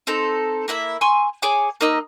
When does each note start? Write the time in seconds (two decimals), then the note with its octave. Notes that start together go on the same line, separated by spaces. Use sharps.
0.07 C4 D#4 A4
0.68 A#3 E4 E5
1.01 G#5 C6 C#6 E6
1.42 G#4 C#5 G#5 D6
1.81 A#3 D#4 D#5 E6